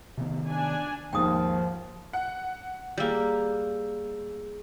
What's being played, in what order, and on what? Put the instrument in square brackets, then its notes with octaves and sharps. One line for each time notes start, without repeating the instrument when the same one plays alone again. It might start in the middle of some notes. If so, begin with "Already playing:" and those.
[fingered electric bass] C3 D#3 B3
[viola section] D4 G#5
[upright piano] D#2 G#2 A#3 [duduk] F3 [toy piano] G5 D#6
[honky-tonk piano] F#5
[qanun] G3 A#3 [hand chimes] G#4 E6 G6